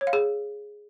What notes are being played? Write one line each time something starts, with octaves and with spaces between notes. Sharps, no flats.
C#5
F5
G#4